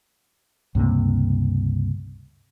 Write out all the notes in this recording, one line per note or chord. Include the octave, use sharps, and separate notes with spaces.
C#2 G2 C3 A#3